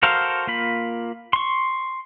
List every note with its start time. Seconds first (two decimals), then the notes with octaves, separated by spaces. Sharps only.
0.03 F#4 A4 A#4 C5 F5
0.47 A#3 F4 B5
1.33 C6 C#6